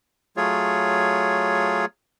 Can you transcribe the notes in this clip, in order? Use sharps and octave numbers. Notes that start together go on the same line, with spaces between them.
F#3 A3 F4 G#4 C#5